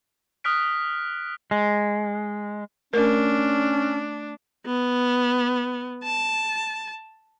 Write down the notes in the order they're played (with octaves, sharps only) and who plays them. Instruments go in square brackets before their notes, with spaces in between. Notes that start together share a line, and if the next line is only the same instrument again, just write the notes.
[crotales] D#6 F6 F#6 B6 D7
[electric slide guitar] G#3
[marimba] A3 [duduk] C#4 [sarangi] D4 [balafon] A#4
[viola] B3
A5